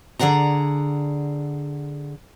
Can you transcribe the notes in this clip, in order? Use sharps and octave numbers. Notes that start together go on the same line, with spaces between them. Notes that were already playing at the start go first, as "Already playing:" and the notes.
D3 G#4 D5 F#5 A#5